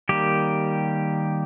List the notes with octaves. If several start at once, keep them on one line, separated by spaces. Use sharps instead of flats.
D#3 G3 A#3 G4